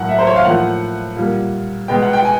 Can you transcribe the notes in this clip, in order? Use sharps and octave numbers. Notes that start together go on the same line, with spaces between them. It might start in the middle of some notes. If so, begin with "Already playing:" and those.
Already playing: A2 F#3 A#3 F#5
E5
C5
C#5
F5
A2 F3 A#3 F#5
A#2 G3 A#3
B2 G#3 B3 G5
F#5
G5
G#5